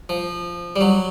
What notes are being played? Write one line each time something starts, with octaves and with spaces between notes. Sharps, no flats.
F3
G3
F#3